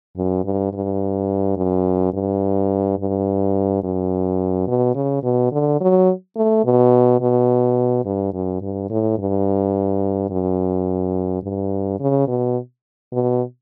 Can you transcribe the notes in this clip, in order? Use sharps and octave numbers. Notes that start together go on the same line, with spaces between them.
F#2
G2
G2
F#2
G2
G2
F#2
B2
C#3
B2
D3
F#3
A3
B2
B2
G2
F#2
G2
A2
G2
F#2
G2
C#3
B2
B2